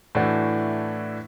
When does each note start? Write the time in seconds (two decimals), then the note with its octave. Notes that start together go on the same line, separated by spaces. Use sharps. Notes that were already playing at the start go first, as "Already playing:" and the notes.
0.15 A2 E3 A3 D4 F#4